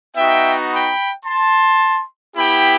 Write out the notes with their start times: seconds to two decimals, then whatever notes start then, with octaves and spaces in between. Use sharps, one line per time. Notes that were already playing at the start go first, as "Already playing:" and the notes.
0.16 B3 D#4 F#4 E5 G5
0.71 G5 B5
1.25 A5 C6
2.35 B3 E4 G4 G5 B5